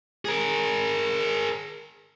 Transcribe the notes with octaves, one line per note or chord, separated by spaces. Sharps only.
G#4 A#4